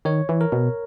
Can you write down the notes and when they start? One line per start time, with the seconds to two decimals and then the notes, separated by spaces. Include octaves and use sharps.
0.05 D#3 C#5
0.29 E3
0.41 A#4
0.52 B2